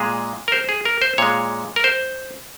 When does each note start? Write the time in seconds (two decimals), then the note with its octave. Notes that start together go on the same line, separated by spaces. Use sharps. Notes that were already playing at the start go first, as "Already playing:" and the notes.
Already playing: A#2 G#3 G#4
0.48 A#4
0.52 C5
0.69 G#4
0.85 A#4
1.02 C5
1.18 A#2 G#3 C#5
1.76 A#4
1.84 C5